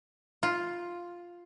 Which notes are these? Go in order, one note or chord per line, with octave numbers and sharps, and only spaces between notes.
F4